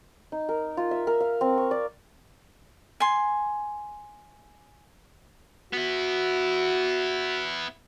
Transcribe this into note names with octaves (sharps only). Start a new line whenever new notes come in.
D#4
A#4
F4
E5
A#4
F5
C4
C#6
D5
G#5 C6
B3 E4 F#4